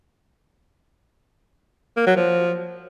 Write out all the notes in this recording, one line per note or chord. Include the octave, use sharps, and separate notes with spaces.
A#3
F#3
F3